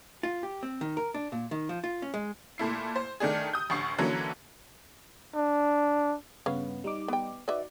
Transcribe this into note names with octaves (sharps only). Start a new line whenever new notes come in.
F4
G4
C4
D#3
A#4
D4
A#2
D#3
F3
F4
C#4
G#3
A#2 A3 E4 C7
C5
D#3 A3 D4 G#4
D#6 G6
A1 D2 C#6 C7
D3 E3 F#3 A#3 C#4
D4
G2 C#3 B3 C#4 F5
G3 D#4 D6
B3 G5
D#4 F#4 B4 D5 E5